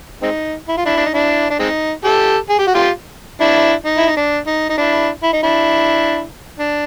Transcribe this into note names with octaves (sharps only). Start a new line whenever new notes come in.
G#3 C4 D#4
E4
F4
D4 E4
D4
D#4
D4 E4
D4
G#3 C4 D#4
G4 A4
G#4
G4
F#4
F4 G4
D4 E4
D#4
E4
D#4
D4
D#4
D#4
D4 E4
E4
D#4
D4 E4
D4